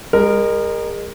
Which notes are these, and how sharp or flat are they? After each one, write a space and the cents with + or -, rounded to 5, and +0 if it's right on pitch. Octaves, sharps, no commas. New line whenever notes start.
G#3 -35 A#4 +0